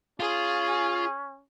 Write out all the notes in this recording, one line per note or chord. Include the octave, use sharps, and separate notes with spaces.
C#4 F4 G#4